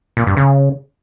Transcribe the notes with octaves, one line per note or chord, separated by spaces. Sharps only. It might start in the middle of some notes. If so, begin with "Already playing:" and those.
A#2
G2
C#3